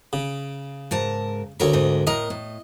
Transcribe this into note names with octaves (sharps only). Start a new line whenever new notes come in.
C#3
G#2 A#4 A5
D2 A4 A#4 C#5 A#5
G#2 D#5
A2 A#4 D#5 A#5
A2